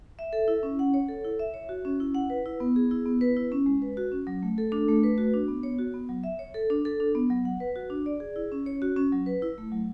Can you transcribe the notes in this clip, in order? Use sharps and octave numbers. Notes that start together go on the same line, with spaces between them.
E5
A4
E4
C#4
F#5
C#5
A4
E4
E5
C#5
F#4
C#4
E4
F#5
B4
E4
B3
G#4
E4
B3
B4
E4
C#4
G#3
B4
F#4
C#4
F#3
A3
A4
D4
A3
B4
F#4
D4
B3
C#5
F#4
B3
F#3
E5
C#5
A4
D4
A4
D4
B3
F#3
F#5
B4
F#4
D4
D5
G#4
E4
C#4
C#5
F#4
C#4
F#3
B4
E4
A3
F#3